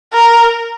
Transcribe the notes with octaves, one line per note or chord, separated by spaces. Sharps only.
A#4